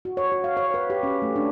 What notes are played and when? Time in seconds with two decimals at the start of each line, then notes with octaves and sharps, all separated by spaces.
0.05 F#4
0.17 C#5
0.32 F#4
0.44 F5
0.57 C#5
0.74 B4
0.90 G4
1.03 C#4
1.22 A3
1.36 D4